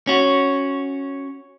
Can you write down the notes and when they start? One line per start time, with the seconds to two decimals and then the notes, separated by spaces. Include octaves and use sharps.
0.07 C#4 F#4